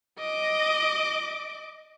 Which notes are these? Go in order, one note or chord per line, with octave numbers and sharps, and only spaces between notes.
D#5 D6